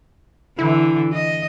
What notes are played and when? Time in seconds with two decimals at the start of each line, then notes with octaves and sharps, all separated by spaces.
0.59 D3 E3 E4
1.13 D#5